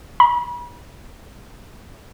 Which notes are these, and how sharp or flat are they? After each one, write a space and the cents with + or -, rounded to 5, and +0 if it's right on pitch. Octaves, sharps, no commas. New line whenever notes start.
B5 -40